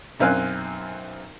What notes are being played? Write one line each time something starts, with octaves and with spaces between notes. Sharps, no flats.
B1 F#2 C4 F5 G#5 F#6